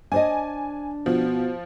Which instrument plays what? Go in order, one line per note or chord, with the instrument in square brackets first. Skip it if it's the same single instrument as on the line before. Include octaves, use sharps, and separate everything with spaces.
[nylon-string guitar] D4 C5 D#5 [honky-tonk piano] G#5
[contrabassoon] B2 [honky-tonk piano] F3